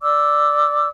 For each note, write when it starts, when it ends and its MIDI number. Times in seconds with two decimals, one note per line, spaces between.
0.02 0.88 74
0.02 0.88 86
0.02 0.88 88